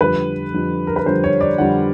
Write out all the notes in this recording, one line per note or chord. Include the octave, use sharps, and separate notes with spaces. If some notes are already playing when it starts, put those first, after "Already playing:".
F2 D3 G3 B4
F2 D3 G3
A#4
B4
F2 D3 G3 C5
C#5
D5
F2 D3 G3 F#5